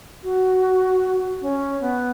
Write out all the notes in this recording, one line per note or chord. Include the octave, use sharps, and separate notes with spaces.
F#4
C#4
B3